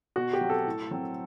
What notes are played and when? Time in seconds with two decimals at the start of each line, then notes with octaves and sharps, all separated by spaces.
0.16 B2 F#4
0.33 G4
0.41 F#3 C4
0.50 A4
0.67 A2
0.91 F#3 C4